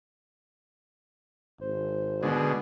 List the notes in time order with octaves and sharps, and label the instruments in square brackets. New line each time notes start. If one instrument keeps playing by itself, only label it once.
[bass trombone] G#1 [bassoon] C5
[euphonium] B2 [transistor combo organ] D3 G#3